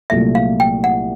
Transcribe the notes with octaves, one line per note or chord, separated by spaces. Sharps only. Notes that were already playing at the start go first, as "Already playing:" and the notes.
C2 A#2 F#3 A3 E5
F5
G5
F#5